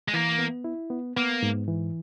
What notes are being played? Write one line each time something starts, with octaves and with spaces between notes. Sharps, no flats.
G#3
E3 A#3
B3
E4
B3
A#3 B3
G#2
E3